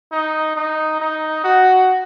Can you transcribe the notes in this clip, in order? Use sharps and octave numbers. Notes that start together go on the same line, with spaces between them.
D#4
D#4
D#4
F#4